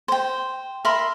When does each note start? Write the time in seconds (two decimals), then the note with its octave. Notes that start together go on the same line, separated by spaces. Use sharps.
0.08 C5 G5
0.85 A#4 E5 B5 C6